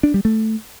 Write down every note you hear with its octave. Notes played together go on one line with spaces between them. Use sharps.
D4
G3
A3